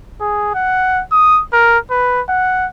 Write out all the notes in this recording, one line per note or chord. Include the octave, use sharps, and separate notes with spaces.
G#4
F#5
D#6
A#4
B4
F#5